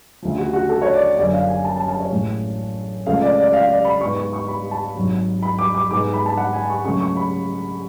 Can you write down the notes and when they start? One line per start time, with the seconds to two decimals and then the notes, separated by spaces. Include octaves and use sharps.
0.22 D2 C#3 F3
0.38 F#4
0.53 F#4
0.69 A4
0.82 C#5
0.94 D5
1.17 F#1 F#2 D3 D5
1.33 F5
1.49 G#5
1.65 A5
1.76 A5
1.88 A5
2.00 C#5
2.12 A1 A2 G#3
3.06 C#2 C#3 F3 A3 F5
3.22 D5
3.38 D5
3.53 F5
3.69 D5
3.85 B5
4.01 G#2 G#3 B3 C#6
4.16 C#6
4.33 C#6
4.48 B5
4.71 A5
4.96 G#1 G#2 F#3
5.43 B5
5.59 D6
5.75 D6
5.91 G#2 G#3 B3 D6
6.14 B5
6.26 A5
6.37 F#5
6.53 G#5
6.70 C#6
6.85 C#2 C#3 F#3 A3 C#4 C#6
7.00 C#6
7.17 B5